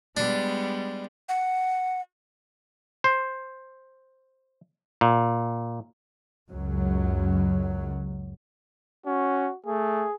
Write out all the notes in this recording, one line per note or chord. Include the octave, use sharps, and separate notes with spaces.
G3 G#3 B3 D4
F#5
C5
A#2
C#2 F#2 F#3
C#4 F#4
A3 G#4